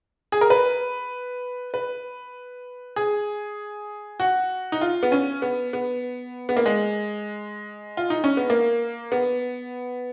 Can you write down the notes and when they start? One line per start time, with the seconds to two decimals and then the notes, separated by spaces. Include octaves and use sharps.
0.32 G#4
0.41 A#4
0.50 B4
1.74 B4
2.96 G#4
4.20 F#4
4.72 D#4
4.81 F4
5.03 B3
5.12 C#4
5.42 B3
5.73 B3
6.49 B3
6.57 A#3
6.66 G#3
7.97 F4
8.10 D#4
8.24 C#4
8.37 B3
8.50 A#3
9.12 B3